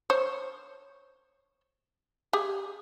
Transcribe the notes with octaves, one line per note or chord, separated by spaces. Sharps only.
C5 C#5
G4 G#4